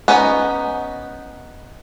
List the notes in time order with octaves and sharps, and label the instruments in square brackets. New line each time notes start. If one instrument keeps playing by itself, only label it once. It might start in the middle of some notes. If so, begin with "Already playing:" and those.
[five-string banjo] B3 C#4 D#4 A4 B4